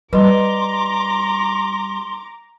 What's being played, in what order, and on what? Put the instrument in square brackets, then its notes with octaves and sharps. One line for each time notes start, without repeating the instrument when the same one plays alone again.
[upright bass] G3 [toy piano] B4 D#5 [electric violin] A#5 D6 [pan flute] C6